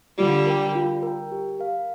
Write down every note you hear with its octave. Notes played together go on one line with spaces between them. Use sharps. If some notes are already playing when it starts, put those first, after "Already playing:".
D3 G3 F4
A#4 G5
F4
A#4 G5
G4
A#4 F5